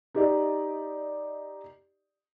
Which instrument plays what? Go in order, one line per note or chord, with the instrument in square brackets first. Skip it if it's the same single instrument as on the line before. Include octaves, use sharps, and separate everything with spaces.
[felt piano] D#4 G4 D5 D#5